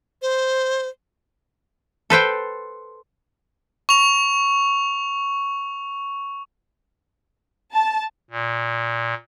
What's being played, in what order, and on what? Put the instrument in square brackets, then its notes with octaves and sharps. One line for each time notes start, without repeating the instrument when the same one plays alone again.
[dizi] C5
[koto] A4 B4 C5 G5
[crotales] C#6 F7
[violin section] A5
[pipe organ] A#2